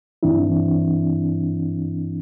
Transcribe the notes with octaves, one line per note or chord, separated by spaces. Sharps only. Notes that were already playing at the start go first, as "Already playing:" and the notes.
G2 E3 C4 D4 E4